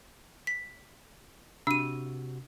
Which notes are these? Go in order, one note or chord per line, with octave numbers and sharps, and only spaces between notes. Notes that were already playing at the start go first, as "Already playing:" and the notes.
B6
C3 D4 F#4 E6 D#7